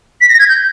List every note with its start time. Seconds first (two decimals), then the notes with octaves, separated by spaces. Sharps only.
0.21 B6
0.29 A#6
0.39 G#6
0.49 G6